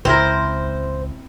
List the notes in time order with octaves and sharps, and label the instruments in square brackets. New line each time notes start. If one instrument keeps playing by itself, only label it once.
[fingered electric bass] C#2 [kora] C4 E4 A#4 [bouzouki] C5